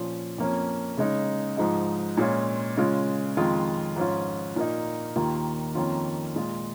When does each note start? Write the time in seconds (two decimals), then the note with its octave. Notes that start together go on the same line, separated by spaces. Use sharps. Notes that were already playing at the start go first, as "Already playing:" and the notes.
Already playing: A#2 F3 C#4 F4
0.38 F2 F3 A#3 C#4
0.97 C#3 G#3 D#4
1.57 G#2 F3 G#3 D#4
2.17 A#2 G#3 C#4 F4
2.77 C#3 G#3 F4
3.37 F2 D#3 G#3 F4
3.96 G#2 F3 C#4 F4
4.56 A#2 A#3 D#4
5.16 D#2 D#3 A#3 F4
5.75 F2 D#3 A#3 C#4 F4
6.35 A#2 G#3 F4